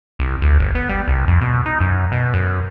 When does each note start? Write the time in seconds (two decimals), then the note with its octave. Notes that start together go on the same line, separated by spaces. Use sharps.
0.19 C2
0.42 D2
0.59 G1
0.75 B3
0.89 G3
1.08 C2
1.28 F2
1.41 B2
1.66 D#4
1.80 F#2
2.12 B2
2.34 F#2